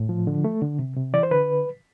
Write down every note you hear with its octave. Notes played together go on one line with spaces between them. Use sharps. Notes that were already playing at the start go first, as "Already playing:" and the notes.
Already playing: A2
F3
D3
A3
D3
C3
C3
E3 D5
C5
D3 B4